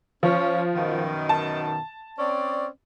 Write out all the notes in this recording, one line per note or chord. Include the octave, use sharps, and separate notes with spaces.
F3 C#4 C#5
F#2 B2 D#3
A5
C4 C#4 D5